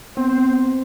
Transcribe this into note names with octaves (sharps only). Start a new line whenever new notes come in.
B3 C4 C5